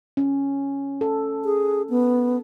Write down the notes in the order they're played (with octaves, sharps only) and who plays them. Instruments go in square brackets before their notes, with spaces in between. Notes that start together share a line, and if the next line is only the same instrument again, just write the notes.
[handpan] C#4
A4
[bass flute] G#4
B3